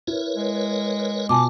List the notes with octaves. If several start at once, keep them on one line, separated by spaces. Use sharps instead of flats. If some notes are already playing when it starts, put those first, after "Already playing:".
E4 A#4 B4 C#5
G#3
B2 F4 F#4 G#5 A5 D6